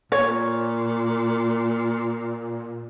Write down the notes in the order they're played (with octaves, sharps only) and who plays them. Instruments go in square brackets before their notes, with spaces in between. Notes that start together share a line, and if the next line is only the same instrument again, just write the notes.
[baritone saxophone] A#2 [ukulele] C#5